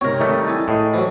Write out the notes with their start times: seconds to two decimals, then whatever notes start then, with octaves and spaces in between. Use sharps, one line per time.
0.01 G#2 C3 C4 A#4 C#5
0.20 D#3 G3 A3 D#4
0.48 E4 A4 G#5
0.68 A2 G#4 D#5
0.94 E3 F#3 C5